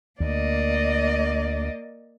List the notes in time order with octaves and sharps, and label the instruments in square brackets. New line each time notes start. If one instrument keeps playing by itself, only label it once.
[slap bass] D2 [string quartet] A#3 D5 D#5